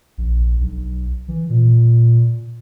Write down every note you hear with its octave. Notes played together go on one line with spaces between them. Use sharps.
A#1
B1
E3
A#2